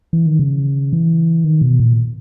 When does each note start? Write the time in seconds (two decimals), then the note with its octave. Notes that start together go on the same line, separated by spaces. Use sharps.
0.13 E3
0.26 D#3
0.39 C#3
0.93 E3
1.44 D#3
1.61 B2
1.80 A#2